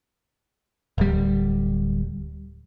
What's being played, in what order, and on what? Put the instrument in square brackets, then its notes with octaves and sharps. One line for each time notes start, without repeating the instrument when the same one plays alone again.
[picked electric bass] D1 G3